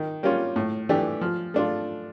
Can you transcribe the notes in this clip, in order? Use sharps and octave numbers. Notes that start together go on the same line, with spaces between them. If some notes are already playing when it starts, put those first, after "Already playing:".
Already playing: D#3
G3 A#3 C#4 F4
A2
E3 A3 D4 G4
F3
A3 D4 F4